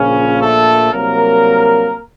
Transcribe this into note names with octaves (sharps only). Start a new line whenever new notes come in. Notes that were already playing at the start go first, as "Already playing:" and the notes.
Already playing: A#1 A#2 C#3 F3 C#4
A3 A4
C2 C3 F#3 A#3 A#4